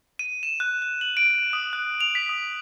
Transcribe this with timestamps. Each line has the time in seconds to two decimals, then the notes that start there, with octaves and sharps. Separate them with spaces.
0.19 D#7
0.43 E7
0.60 F#6
0.82 F#6
1.01 F#7
1.17 D7
1.53 D#6
1.73 F#6
2.01 F7
2.15 B6
2.29 D#6